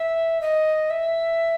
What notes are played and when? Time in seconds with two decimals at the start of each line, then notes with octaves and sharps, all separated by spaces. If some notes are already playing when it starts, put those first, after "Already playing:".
Already playing: E5
0.41 D#5
0.90 E5